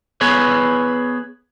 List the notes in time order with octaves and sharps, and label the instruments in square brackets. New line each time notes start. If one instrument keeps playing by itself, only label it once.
[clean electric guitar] B3 G#4 B4 C#5